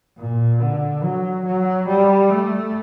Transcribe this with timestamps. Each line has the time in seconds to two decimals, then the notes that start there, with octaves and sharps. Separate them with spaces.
0.19 A#2
0.61 D3
1.03 F#3
1.46 F#3
1.88 G3
2.30 A3